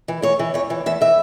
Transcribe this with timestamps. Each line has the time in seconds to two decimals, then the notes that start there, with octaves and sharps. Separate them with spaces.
0.08 E3
0.22 E2 C#5
0.39 E3
0.54 E2 C#5
0.70 E3
0.86 E2 E5
1.01 E3 E5